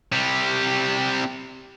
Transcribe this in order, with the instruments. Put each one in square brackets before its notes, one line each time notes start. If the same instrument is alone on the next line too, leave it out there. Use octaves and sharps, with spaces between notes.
[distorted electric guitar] C3 G3